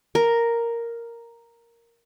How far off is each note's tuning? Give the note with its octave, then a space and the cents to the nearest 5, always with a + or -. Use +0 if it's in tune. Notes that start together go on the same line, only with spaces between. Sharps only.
A#4 +0